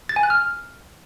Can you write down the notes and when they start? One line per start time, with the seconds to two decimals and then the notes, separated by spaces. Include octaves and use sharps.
0.09 A6
0.16 G#5
0.23 F#6
0.30 F6